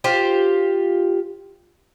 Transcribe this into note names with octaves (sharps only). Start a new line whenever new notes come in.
F4 G4 C5